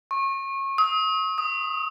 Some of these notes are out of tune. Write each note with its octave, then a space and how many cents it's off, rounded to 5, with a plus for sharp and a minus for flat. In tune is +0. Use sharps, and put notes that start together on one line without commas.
C#6 -30
D#6 +40
D#6 +0